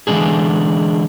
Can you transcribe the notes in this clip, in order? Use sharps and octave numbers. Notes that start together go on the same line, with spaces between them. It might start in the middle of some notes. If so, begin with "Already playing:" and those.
D3 E3 G#3 C#4 D4 G#4